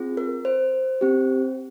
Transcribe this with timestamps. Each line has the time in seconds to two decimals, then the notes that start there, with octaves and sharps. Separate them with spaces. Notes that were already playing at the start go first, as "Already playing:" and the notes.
Already playing: C4 F4 G#4
0.17 A#4
0.45 C5
1.01 C4 G4